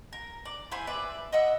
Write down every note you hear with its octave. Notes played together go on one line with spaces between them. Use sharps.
A#4
D5
E4 C5 G#5 B5
B4 D5 E5
D#5 E5 F#5 E6